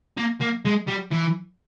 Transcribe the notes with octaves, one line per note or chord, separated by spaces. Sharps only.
A#3
A#3
G#3
G3
E3